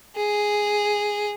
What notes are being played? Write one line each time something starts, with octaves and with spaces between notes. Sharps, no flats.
G#4